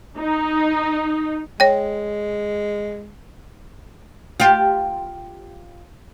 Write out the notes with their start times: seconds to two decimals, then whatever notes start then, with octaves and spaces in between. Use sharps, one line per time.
0.18 D#4
1.60 G#3 C#5 G5
4.40 F4 G4